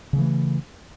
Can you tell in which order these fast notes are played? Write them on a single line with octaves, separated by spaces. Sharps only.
C#3 G3 E3 A3